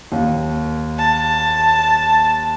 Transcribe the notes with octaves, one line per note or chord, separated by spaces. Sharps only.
D#2
A5